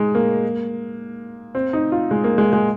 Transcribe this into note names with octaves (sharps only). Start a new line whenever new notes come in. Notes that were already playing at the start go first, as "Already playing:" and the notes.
Already playing: G#3 D#4
A#3
C4
D#4
F4
G#3
A#3
G#3
G#3